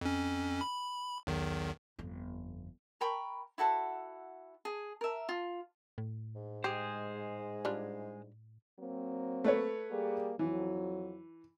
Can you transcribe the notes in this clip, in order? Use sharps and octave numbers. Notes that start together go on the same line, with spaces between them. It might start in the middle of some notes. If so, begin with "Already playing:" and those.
F2 C#4
B5
B1 E2 D#3
G1 F2
A#4 G5 B5 C#6
E4 F#4 A4 F#5
G#4
A#4 E5
F4
A2
G#2
G#3 G4 G#4 C5
G3 D4 F4
F#3 A#3 C4
A3 B4 C#5
G3 A#3 G#4
F2 E3 F#3